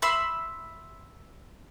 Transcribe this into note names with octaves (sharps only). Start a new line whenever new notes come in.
E5 B5 C6 E6